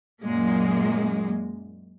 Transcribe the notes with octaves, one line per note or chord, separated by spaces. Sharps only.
F#2 A#2 G#3 A#3